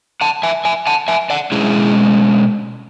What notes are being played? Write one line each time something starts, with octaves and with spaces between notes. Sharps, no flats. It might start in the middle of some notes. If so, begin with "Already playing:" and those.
F#5 A5
E5 G#5
E5 G#5
F#5 A5
E5 G#5
D5 F#5
B2 G#3 C#4 E4 G#4